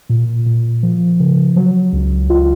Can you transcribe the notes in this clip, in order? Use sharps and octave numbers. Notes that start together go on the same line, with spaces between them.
A#2
A#2
F3
C#3
F#3
C#2
F4